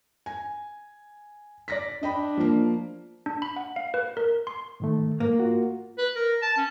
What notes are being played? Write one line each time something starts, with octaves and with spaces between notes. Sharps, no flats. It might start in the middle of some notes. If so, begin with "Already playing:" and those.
G#5
D5 A#6 B6
D4 D#5 G5 B5
F3 A#3
D4
B5
F#5
F5
B4
A#4
C6
G#2 D#3 A3
G#2 A#3
F4 F#4
B4
A#4
A5
C#4